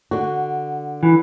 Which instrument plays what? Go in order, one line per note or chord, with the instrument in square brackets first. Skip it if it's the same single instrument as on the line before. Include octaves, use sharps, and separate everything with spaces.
[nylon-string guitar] D3 F#4
[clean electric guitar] E3